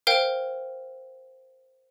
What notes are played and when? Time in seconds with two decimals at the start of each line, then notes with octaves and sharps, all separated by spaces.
0.07 A#4 C5 F5 G5